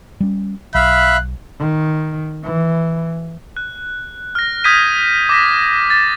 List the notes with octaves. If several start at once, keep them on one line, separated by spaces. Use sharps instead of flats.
G3 C#4
B1 E5 F5 B5 F#6
D#3
E3
F#6
F6 A#6
D#6 G6 G#6 B6 D#7
D6 A#6 B6
A6